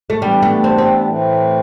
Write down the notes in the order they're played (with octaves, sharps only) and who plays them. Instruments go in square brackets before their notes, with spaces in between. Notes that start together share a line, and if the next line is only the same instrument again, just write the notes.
[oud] A3
[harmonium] E3 B3 D4 G4 [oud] G3
[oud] A3
C4
C4
[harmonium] A2 E3 A3 C4